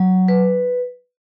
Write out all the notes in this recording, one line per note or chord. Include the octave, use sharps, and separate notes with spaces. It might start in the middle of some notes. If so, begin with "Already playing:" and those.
Already playing: F#3
B4